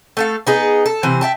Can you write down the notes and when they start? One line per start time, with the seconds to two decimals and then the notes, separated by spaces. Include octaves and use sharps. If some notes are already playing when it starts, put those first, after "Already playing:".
0.17 A3 A4 F5
0.47 B3 D#4 G#4
0.86 A4
1.03 C3 E3 C5
1.21 E5 G5 A5